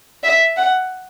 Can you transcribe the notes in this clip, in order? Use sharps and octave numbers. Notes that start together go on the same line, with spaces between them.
E5
F#5